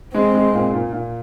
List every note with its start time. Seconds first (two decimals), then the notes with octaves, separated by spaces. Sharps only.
0.14 G#3 C4
0.34 G#3
0.54 A#2
0.74 A#2
0.93 A#2